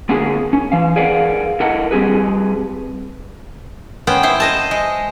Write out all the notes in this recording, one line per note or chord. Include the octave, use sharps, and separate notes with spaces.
D3 B3 C#4 F#4 G#4 A#4
C#4
E3 F5
G#4 A#4 B4 D5 F5 F#5
E4 A4 A#4 D#5 F#5
G3 C4 G4 G#4 B4
B3 C#4 C5 G5
E4 C5
C5 D#5 A5
G#3